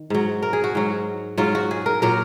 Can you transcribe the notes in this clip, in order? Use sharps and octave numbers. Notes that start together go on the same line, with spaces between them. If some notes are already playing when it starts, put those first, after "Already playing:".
Already playing: D#3
G#2 F#3
A#4
G#4
F#4
G#2 F#3
G#2 F#3 F4
F#4
G#4
A#4
A#2 F#3 A#4